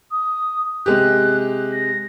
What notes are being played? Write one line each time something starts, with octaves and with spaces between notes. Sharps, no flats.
D#6
C3 G#3 G4 F#6
A#6